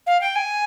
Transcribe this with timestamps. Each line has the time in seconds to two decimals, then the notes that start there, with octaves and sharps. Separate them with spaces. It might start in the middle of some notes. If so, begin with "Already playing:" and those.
0.07 F5
0.21 G5
0.36 G#5